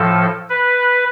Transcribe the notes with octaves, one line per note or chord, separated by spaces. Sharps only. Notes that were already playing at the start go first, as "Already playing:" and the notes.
Already playing: A2 F3 A4
B4